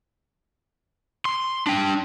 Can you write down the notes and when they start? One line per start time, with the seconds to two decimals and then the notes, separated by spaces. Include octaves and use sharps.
1.25 C6
1.67 D4 G5